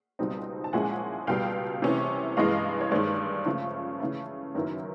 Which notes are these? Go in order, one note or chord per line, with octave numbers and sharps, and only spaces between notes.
C#2 B2 G3 C4 D#4
A5
A#2 F3 G#3 C#4 E4 F#5 G#5
C#2 B2 G3 F5 G5
C3 E3 A3 C#4 E4
G2 E3 G#3 D#5 F5
C#5
G2 D#3 G#3 C5 D5
C#3 F3 A3
C#3 E3 A3
F#2 D#3 F#3 B3 E4 A#4